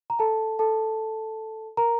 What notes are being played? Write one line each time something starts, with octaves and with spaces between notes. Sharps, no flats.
A#5
A4 A5
A4 A5
A#4 A#5